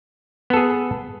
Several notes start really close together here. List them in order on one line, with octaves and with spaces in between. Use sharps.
B3 A4 G#4